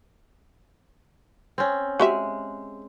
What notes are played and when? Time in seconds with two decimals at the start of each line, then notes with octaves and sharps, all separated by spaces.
1.58 C4 C#4
2.00 G#3 F#4 G4 E5